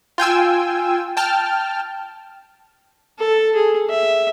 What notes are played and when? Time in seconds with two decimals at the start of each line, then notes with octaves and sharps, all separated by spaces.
0.18 F4 G5 G#5 E6
1.17 G5 A5 F6
3.19 A4
3.55 G#4
3.89 E5